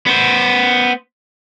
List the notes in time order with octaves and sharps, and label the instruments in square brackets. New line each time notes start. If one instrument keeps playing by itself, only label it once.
[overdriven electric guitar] B3 C5